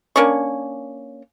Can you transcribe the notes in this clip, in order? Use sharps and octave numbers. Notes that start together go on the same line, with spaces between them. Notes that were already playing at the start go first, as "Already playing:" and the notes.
A#3 C#4 D4 C#6